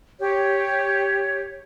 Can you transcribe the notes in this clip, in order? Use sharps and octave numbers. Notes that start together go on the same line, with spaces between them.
G4 C#5